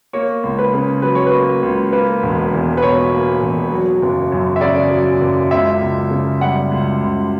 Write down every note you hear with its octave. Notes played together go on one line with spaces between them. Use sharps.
A#3 C#5
C#2
B4
C#3
F#3 B4
C#5
B4
A#3
C#2
A#3 B4
E1
E2
B4
B2 C#5
A#3
E1
F#3
F#1
F#2
E5
C#3 D5
F#3
F#1
C#2 E5
C#2
C#3
G3 F#5
C#2
C#2